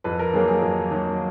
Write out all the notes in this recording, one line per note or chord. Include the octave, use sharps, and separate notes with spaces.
F2 B4
A#4
D#3 F#3 A#3 G#4
G#4
F2
D#3 F#3 A#3